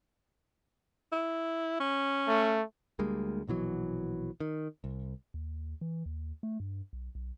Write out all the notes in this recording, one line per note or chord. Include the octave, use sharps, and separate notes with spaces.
E4
C#4
A3
D2 G3 G#3 A#3
A#1 B2 E3 F#3
D#3
C2
D#2
E3
D#2
A3
G2
B1
B1